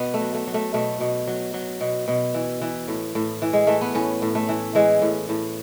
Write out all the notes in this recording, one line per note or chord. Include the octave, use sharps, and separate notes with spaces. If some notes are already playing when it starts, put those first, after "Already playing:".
Already playing: B2 B3
A3
F#3
A3
F#3
A3
B2 A3
B2
F#3
F#3
B2
B2
E3
E3
A2
A2
E3
G#3
E3 A3
B3
A2 C#4
A2
A3
E3
E3 G#3
A2
A2